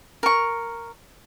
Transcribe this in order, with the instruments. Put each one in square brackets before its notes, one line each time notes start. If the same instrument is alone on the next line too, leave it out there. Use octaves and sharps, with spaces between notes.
[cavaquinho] A#4 C#6